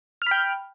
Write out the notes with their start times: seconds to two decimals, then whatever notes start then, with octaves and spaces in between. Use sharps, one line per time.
0.22 F6
0.26 B5
0.31 G5